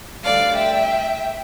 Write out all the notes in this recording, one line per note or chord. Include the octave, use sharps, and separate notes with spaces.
D2 D3 G3 D5 F5
E5 G5